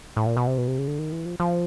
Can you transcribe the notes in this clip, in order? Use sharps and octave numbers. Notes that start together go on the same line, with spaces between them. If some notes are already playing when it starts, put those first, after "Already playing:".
A2
A#2
B2
C3
B2
C3
C#3
D3
D#3
E3
F3
F3